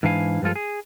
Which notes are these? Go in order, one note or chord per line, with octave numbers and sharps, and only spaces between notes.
G#2 E3 D4 E4 F5 G#5
G2 F3 G#3 F4 A4
G#4